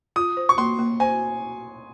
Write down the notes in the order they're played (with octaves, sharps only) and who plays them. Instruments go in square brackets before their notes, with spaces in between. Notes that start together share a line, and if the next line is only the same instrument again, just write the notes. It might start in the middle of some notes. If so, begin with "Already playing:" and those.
[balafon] F4 [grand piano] D#6
[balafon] C5
[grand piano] C#6
[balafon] A#3 [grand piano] C6
[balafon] A#3
[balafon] C5 [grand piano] G#5